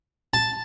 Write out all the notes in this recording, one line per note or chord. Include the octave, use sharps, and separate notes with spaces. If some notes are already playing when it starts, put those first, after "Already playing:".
A5